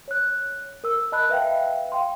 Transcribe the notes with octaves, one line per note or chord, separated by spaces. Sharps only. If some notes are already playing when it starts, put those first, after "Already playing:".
C#5 F#6
A#4 E6
D#5 A5 B5 F#6
B4 E5 F5 G5
F5 G5 C6